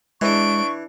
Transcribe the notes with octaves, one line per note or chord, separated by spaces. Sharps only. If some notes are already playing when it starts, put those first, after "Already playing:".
E3 G#3 D4 C#6 D7